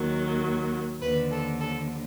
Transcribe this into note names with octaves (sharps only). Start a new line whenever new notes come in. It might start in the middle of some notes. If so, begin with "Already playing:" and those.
Already playing: D#2 D#3 F#3
D#2 D3 F3 B4
A4
A4